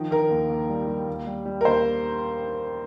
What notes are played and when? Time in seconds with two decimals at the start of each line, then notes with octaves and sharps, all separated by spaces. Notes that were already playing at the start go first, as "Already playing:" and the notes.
Already playing: D#3 F3
0.11 D#3 A#4
0.30 D#2
0.50 D#2
0.69 G3
0.88 G3
1.08 D#2
1.27 G3
1.45 G3
1.61 A#4
1.65 D#2 C5